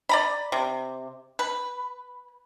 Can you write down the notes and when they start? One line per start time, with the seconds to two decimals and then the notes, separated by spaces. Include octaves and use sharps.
0.09 D5 A#5 B5
0.52 C3
1.39 B4